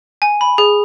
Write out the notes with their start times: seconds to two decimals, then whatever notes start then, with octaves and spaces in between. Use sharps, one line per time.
0.22 G#5
0.41 B5
0.58 G#4